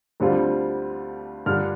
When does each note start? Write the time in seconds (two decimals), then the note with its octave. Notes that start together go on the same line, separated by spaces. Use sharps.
0.20 D2 D3 G3 C4 F4
1.46 G2 D3 G3 D4 F4 F6